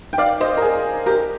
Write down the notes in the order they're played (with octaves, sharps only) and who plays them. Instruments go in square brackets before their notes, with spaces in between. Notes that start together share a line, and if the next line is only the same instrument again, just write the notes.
[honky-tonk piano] G5
D5 F5
C5 D#5
A#4
G#4
G4 A#4